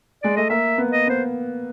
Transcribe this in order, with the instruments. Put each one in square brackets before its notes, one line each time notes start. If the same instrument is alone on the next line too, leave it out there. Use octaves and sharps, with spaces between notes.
[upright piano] G#3 [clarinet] D5
[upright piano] A3 [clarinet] D#5
[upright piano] A#3 [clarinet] E5
[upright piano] B3
[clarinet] D#5
[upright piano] B3 [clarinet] C5